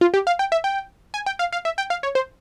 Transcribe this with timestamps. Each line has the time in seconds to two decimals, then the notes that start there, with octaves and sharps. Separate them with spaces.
0.01 F4
0.14 G4
0.27 F5
0.39 G5
0.52 E5
0.64 G5
1.14 G#5
1.26 G5
1.39 F5
1.52 F5
1.65 E5
1.78 G5
1.90 F5
2.03 C#5
2.15 C5